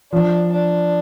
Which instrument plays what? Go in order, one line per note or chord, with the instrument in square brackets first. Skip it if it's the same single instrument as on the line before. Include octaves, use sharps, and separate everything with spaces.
[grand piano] F3 [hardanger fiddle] D4
[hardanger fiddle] D4